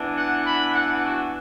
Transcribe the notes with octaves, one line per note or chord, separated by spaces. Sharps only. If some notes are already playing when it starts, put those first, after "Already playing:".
Already playing: E3 B3 D4
F#5
B5
F#5
F#4